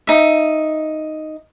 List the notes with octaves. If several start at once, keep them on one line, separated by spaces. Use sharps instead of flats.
D#4 E5